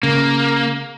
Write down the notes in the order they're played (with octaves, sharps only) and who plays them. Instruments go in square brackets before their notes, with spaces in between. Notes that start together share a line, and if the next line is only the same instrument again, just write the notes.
[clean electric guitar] C#3 [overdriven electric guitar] A#3